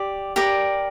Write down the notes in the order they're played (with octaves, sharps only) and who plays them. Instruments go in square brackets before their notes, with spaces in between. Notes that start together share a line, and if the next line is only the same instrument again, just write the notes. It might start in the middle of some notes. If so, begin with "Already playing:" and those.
Already playing: [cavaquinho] G4 D5
G4 A#4 D5